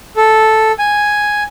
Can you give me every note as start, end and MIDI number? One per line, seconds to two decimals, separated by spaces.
0.16 0.72 69
0.79 1.43 80